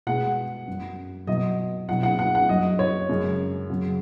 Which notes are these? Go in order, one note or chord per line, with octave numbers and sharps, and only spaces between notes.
B2 G#3 F#5
F#2 F#3
B2 F#3 D#5
B2 F#3 F#5
F#5
F#5
F#5
F#2 F#3 D#5
C#5
F#2 C#3 G#3
F#2 C#3 F#3